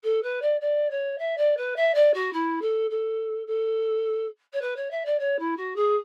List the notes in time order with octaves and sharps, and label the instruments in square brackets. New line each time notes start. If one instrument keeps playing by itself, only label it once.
[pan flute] A4
B4
D5
D5
C#5
E5
D5
B4
E5
D5
F#4
E4
A4
A4
A4
C#5
B4
C#5
E5
D5
C#5
E4
F#4
G#4